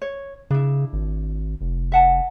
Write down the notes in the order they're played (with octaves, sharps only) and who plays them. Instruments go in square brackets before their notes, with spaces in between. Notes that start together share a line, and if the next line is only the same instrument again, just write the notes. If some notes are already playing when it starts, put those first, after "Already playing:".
[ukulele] C#5
[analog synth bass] C#3 [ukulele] D4 E4
[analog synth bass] G#1
F1
[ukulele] E5 F#5 A5